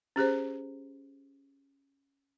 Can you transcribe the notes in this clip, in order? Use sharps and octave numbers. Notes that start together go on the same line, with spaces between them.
C#4 G4 G#4 C5